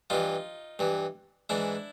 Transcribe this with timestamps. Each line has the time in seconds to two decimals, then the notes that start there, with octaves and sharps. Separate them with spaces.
0.10 G2 E3 D#4 F4
0.79 G2 E3
1.49 G#2 E3 D4 E4